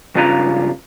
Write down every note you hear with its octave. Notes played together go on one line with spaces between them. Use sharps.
C#2 G2 C#3 F4 B4 A#5